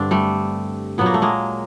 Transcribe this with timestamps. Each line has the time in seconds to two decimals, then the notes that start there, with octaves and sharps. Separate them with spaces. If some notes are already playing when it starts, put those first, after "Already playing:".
Already playing: G2 D3 C4 D4
0.11 G3 A3
0.98 A#2 F#3 B3
1.06 A#3
1.14 A3
1.22 G#3 A#3